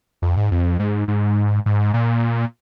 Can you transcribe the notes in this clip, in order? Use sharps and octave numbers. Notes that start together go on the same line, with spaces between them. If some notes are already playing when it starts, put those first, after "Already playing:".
F2
G#2
F2
G#2
G#2
G#2
A#2